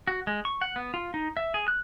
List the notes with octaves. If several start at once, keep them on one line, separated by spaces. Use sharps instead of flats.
F#4
G#3
C#6
F#5
B3
F4
D#4
E5
G#4
F#6